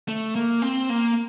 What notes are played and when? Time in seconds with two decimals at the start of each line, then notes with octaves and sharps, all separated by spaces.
0.09 A3
0.36 A#3
0.62 C4
0.90 A#3